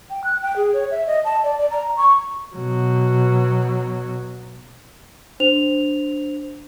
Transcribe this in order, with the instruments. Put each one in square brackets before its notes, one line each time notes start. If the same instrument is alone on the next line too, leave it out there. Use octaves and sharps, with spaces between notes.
[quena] G5
F#6
G5
G#4
C#5
E5
D#5
A5
D5
D5
A#5
C#6
[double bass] B2 F#3
[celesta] D4 C5 F7